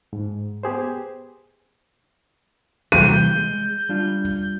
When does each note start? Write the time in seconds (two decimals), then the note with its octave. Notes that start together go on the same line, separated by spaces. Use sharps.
0.13 G#2
0.63 B3 G4 G#4 C5
2.92 C3 E3 G3 G6 D#7
3.36 G#3
3.89 G3 D4 F4